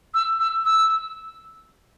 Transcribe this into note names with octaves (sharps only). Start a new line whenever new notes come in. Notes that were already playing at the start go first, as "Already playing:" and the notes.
E6
E6
E6